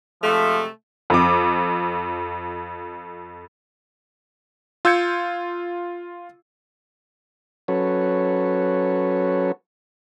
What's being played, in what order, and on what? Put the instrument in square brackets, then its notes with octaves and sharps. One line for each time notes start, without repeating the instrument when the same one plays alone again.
[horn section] C3 G#3 A3 [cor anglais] F3
[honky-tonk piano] F2 D6
[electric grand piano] F4 E6 G6 G#6 C#7
[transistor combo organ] F#3 C#4 F#4 A4 B4 C#5